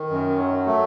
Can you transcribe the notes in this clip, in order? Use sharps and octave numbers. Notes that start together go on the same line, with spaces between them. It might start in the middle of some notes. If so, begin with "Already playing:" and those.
Already playing: D#3
F#2
F#3
A3